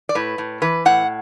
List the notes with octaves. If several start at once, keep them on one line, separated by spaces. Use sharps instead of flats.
D5
A2 B4
A2
E3 B4
A2 F#5